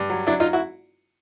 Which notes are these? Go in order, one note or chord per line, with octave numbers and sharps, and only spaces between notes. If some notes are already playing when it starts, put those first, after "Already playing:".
Already playing: G2
F#3
F#3 D4 E4
D#4 F4
E4 F#4